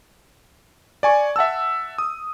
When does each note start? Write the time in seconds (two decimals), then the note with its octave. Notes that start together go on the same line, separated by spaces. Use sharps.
1.03 D5 G#5 C#6
1.36 E5 F#5 A5 E6
1.98 D#6